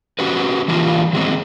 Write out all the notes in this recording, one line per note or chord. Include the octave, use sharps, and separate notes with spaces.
C#4 F#4 G4 B4
E3 G3 A#3 D4 F4
D#3 F#3 G#3 B3 C4